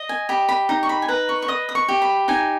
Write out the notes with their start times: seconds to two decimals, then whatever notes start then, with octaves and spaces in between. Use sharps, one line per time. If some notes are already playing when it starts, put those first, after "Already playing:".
Already playing: D#5
0.09 G#5
0.29 G4 B5
0.49 B5
0.69 D#4 A#5
0.83 C#6
0.89 B5
1.02 G#5
1.08 B4 A#5
1.29 C#6
1.42 C#6
1.48 D#5 D#6
1.69 D#6
1.75 C#6
1.88 G4
2.02 B5
2.28 D#4 G#5